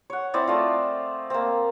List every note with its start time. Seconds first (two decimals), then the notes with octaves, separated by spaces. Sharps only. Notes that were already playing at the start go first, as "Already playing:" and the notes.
0.10 C#5 F#5
0.34 C4 E4 D5 D#5
0.48 A3 F4
1.30 A#3 C4